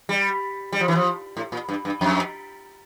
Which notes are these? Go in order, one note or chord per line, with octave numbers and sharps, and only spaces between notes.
G3
G3
F3
E3
F3
A2
A#2
G2
G2
F2